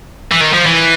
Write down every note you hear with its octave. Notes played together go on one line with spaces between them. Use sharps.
E3
D#3
F3
E3